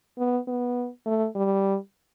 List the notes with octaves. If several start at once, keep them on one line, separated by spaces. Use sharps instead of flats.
B3
B3
A3
G3